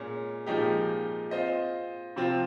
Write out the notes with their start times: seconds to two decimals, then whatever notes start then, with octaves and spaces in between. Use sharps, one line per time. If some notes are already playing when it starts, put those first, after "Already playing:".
Already playing: A#2 G#3 C#4
0.46 A#2 F3 G#3 D#4 G4
1.31 C4 F4 C5 D#5
2.16 C3 F3 C4 F4